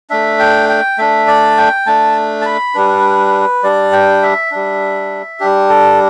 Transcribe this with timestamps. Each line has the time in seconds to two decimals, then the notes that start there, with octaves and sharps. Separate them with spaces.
0.10 A3 D4 E5
0.40 G5
0.69 G5
0.98 A3 D4 E5
1.28 D5
1.58 G5
1.86 A3 D4 A5
2.41 A5
2.46 B5
2.75 G3 D4 B4
3.63 G3 D4 D5
3.93 G5
4.22 E5
4.51 G3 D4
5.40 G3 D4 G4
5.69 A4